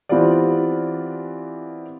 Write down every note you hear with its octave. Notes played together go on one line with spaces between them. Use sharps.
E3 B3 C4 F4 G4 D5